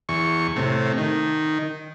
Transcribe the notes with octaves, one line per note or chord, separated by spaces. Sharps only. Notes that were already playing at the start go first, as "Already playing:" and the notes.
E2 C#6
A2 C3
D#3